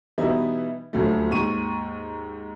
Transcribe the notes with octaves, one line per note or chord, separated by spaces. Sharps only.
B2 E3 G3 B3 D#4 E4
D#1 D2 F#3 A3
D#2 G#2 C#6 D#7